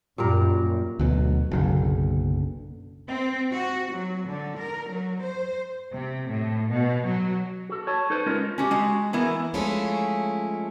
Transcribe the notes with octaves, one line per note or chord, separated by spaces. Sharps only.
F#2 A#2 G3 A#4
D2 B2 F#3
F#1 B1 D3
C4
F#4
F#3
D3
A#4
F#3
C5
C3
A2
B2
F#3
F#4 A4
C#5 A5
D#4 A4 B4 C5
G#3 C#4 F4 A#4 D#5
C#4 F#4 G4
G#3 F#4
E3 B3 E4 A#4
F3 G#3 A3 C#4 E4